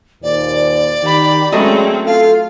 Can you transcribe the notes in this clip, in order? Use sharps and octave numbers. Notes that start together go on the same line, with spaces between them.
D#2 A#2 C5 D5
D#3 G4 B5
F#3 G#3 A3 C4 C#4 D#5
F4 A4 F5